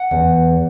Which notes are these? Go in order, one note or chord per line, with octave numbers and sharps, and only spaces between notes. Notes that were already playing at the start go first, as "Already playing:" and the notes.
Already playing: F#5
E2